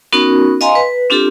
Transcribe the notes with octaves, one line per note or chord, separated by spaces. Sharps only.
B3 C#4 D#4 F#4 A#4
D#5 F5 G#5 A#5 C6
B4
C4 D4 F4 G4 A4